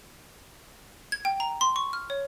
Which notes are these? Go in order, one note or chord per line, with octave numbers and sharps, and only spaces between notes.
G#6
G5
A#5
C6
C#6
F6
C#5